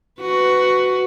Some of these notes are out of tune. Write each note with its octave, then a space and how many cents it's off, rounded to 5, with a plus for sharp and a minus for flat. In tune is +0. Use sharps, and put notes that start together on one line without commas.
F#4 +5 B4 +15